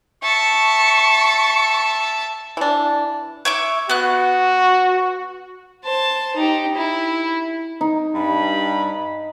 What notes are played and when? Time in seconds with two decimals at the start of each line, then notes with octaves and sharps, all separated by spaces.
0.23 E5 A5 C#6
2.57 E3 D4
3.45 C#5 E5 D6
3.89 B3 F#4 F#6
5.85 C5 A5
6.35 D#4 G4
6.76 E4
7.81 D#4
8.15 G2 B5